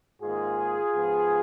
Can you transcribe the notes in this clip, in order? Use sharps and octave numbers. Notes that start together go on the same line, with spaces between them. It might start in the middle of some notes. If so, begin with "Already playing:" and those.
G#2 D#3 A#3 F4 G#4
G#2 F3 B3